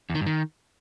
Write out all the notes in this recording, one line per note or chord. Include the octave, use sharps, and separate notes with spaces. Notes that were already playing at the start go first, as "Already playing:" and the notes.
E2
D#3
G2
D#3